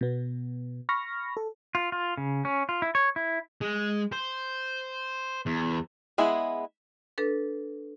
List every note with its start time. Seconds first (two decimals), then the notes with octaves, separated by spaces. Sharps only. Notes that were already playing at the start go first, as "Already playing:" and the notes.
0.01 B2 B3
0.89 B5 C#6 F6 A#6
1.37 A4
1.75 F4
1.92 F4
2.17 C#3
2.45 C#4
2.69 F4
2.82 E4
2.95 C#5
3.16 E4
3.61 G#3
4.12 C5
5.46 E2
6.18 G#3 B3 E4 G#4
7.18 D4 A4 B4